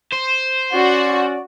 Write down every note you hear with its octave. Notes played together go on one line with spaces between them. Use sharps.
C5
C#4 F#4 D5